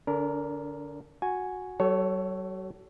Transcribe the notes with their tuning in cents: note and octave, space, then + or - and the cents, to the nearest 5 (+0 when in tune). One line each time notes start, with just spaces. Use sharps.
D3 +0 D4 -40 A#4 +0
F#4 -10 G#5 +0
F#3 +45 A4 +0 C#5 +0